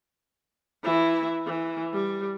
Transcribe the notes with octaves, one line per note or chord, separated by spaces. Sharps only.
E3 E4
E3
G3